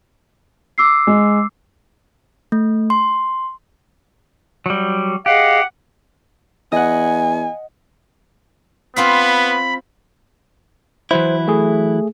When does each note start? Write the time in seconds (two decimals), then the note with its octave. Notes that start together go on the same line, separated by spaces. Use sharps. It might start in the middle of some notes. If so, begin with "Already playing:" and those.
0.78 D6 E6 C7
1.07 G#3
2.52 A3
2.90 C6
4.66 F#3 G3
5.26 G4 G#4 D#5 F5 F#5
6.72 E2 D#5 F#5 G#5
8.96 B3 C4 F4 F5 B5
11.11 E3 F#3 E4 C5
11.48 A3 G#4